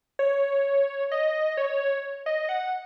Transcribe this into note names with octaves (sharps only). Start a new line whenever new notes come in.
C#5
D#5
C#5
D#5
F#5